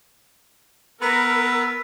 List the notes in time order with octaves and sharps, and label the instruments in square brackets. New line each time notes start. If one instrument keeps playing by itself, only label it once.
[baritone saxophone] B3 [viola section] A#4 [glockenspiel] B5 B6 [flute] E6